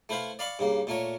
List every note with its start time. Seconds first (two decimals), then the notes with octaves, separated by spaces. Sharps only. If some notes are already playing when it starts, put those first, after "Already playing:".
0.09 A3 E4 B4 C5 F5
0.39 D5 F5 B5 C#6 D6
0.59 G2 C#3 A#3
0.87 A#2 A3 A#4 C#5